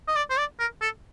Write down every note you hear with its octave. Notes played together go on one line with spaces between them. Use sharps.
D#5
D5
C5
D5
A#4
A4